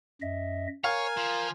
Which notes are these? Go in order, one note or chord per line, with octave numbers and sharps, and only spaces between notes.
F#2 D#5 E5
A#4 C#5 F5 G#5 A#5
F3